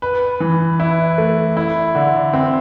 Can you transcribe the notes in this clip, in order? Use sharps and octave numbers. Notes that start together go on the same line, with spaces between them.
B4
E3
E4
A3
E4
D3
C4